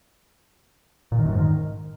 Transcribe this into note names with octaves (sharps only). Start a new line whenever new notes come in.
A#2
D#3
F#2
G#2
D#3